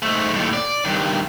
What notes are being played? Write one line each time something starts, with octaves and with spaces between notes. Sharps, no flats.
G#2 A3
D#2 A2
D5
G2 D#3